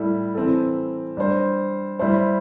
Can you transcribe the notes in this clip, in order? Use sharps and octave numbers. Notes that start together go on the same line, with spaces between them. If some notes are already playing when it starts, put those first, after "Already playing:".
Already playing: A2 G3 E4 A4
E3 C4 A4
G3 D4 C5
G3 E4 C5